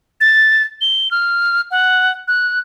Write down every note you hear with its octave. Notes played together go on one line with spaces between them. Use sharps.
A6
G7
F6
F#5
F#6